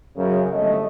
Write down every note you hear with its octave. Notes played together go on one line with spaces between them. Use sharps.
F#2 C#3
G1 G#3 A3 C#5 D#5